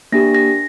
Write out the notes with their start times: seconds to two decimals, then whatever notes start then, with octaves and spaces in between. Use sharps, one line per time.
0.12 A#3 D4 G4 A#6
0.35 A#6